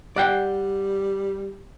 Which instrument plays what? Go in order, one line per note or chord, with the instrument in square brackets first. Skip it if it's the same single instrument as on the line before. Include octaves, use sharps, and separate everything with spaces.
[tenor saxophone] G3 [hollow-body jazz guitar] D5 F#5 G5